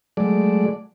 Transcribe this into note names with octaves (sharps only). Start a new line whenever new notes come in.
F#3 G#3 A3 D5